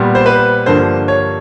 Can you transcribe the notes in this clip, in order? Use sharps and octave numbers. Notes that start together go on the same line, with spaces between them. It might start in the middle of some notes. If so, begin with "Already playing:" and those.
Already playing: A#2 G3 B3
C5
B4
G2 D3 F3 A#3 C5
C#5